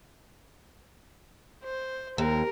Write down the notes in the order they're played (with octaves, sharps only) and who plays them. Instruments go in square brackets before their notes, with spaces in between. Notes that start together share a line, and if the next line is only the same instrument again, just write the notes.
[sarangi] C5
[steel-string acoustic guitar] D#2 [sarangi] A#4